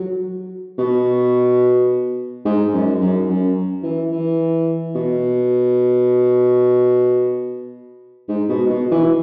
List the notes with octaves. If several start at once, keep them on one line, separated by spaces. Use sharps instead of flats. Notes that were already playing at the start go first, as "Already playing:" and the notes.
Already playing: F#3
B2
G#2
F#2
F#2
F#2
E3
E3
B2
G#2
B2
B2
E3